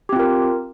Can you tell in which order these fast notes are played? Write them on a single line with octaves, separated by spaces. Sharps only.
G4 C4 F4 A#4